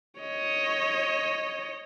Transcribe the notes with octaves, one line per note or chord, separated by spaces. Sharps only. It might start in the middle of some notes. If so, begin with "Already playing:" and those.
C#5 D#5